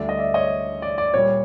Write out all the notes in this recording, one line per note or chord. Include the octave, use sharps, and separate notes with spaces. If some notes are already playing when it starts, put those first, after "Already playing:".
Already playing: D2 D3 G3 D5 E5
D#5
D5 E5
C#5 D#5
D5
D5
A#2 G3 C#5